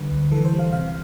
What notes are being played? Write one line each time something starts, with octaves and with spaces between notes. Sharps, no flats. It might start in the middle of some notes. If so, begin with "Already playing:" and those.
Already playing: D3 G3 D4 B4
D2
E3 A4
C5
G3
F5
C3 F5